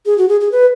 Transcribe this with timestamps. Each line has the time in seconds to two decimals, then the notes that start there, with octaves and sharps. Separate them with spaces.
0.06 G#4
0.18 F#4
0.29 G#4
0.41 G#4
0.52 B4